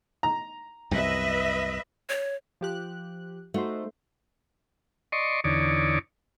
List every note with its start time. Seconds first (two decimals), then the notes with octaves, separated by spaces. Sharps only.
0.23 A#5
0.91 C2 F#2 B4 D#5 E5
2.10 C#5
2.61 F3 G4 F#6
3.54 A3 D#4 F#4 C5
5.12 D5 D#5 C6 C#6
5.44 E2 D3 D#4 C#5 D5